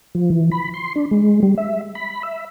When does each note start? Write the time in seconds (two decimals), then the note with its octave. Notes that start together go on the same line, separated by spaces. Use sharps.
0.15 F3
0.30 E3
0.51 B5
0.74 C6
0.96 D4
1.11 G#3
1.43 G3
1.57 E5
1.95 B5
2.23 E5